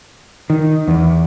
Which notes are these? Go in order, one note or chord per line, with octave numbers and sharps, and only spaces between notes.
D#3
E2